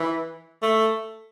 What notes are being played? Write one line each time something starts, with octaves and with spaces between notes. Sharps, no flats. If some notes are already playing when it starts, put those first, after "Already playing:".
Already playing: E3
A3